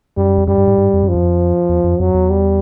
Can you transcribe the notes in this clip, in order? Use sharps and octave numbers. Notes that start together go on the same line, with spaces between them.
F#2 G3
F2
F#2 G3
G2
G#2
G2
F2
F#2 F3
F2
E2
F2
F2 F#3
E2
G3